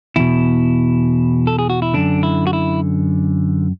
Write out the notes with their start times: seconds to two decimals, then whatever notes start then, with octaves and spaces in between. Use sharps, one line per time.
0.16 E2 B2 E4
1.47 A4
1.59 G#4
1.70 F#4
1.82 E4
1.94 F#2 D3 D4
2.23 E4
2.47 F#4
2.53 E4